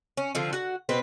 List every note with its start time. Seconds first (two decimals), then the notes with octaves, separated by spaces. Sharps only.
0.17 C#4
0.35 D3 F3 C4
0.53 F#4 F#5
0.89 B2 C4 B4